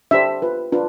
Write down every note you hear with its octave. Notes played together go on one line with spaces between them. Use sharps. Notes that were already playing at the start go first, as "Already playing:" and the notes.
D4 G4 C5 E5
F4 B4
D4 F4 B4